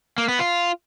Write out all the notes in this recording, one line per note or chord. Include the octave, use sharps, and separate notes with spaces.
A#3
B3
F4